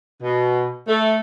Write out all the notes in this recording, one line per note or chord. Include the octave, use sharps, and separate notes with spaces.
B2
A3